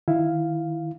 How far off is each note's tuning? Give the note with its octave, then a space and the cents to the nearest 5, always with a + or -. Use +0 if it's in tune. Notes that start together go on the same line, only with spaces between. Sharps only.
D#3 +0 E4 +5 F5 +0